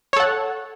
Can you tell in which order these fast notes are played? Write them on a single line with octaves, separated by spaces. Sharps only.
C#5 A4 F#5